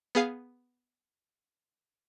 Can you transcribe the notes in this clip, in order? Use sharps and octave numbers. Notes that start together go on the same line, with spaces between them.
B3 G#4 F5 C7